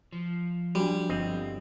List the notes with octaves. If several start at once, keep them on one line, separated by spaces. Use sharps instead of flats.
F3
G3 D4 F#4
G1 C4 D#5